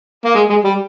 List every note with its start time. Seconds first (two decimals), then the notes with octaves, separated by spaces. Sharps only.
0.25 A#3
0.35 G#3
0.50 G#3
0.64 G3